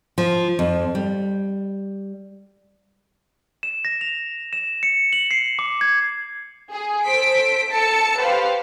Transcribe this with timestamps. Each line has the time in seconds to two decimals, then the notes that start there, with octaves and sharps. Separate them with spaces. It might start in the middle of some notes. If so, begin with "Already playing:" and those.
0.18 F3
0.59 F2
0.95 G3
3.63 E7
3.85 A#6
4.01 F7
4.53 E7
4.83 C#7
5.13 F#7
5.31 C7
5.59 D6
5.81 G#6
6.71 G#4
7.05 A4 C5 B6 D7
7.72 A4 A5 C#7
8.20 G4 B4 C5 F5